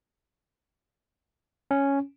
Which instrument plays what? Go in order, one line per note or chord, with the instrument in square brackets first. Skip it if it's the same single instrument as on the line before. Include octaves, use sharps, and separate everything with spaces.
[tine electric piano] C#4